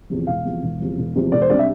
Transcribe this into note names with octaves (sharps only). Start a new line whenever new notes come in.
E2 C3 F3
E1 F5
E2 C3 F3
E1
E2 C3 F3
E1
E2 C3 F3
E1 D5
C5
C3 G3 D4 D5
E5